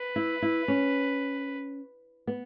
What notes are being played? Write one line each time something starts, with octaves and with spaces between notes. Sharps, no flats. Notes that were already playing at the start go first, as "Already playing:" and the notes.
Already playing: B4
E4
E4
C#4
B3